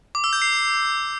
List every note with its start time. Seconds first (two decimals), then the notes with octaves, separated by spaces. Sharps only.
0.15 D6
0.24 E6
0.33 G6
0.42 C7